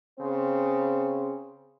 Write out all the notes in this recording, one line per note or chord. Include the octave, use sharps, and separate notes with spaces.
C#3 C4 C5